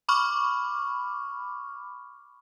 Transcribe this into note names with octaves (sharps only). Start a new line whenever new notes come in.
B5 C#6 D6 F6